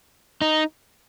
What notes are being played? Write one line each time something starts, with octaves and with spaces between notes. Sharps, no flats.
D#4